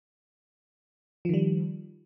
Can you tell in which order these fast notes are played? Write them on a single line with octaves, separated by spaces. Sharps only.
F3 D#3 G3